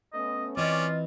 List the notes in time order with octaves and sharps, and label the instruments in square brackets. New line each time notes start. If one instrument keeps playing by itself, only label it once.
[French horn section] A3 B3 C#4 [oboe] D#5
[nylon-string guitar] E3 C4 [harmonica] C#4 D5 [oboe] F4 [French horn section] D#5